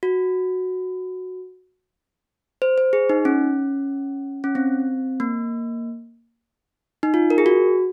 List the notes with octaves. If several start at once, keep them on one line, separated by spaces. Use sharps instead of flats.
F#4
C5
C5
G#4
D#4
C#4
C#4
C4
A#3
D#4
F4
A#4
G#4
F#4